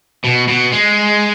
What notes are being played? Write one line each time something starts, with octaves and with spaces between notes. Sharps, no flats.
B2
B2
G#3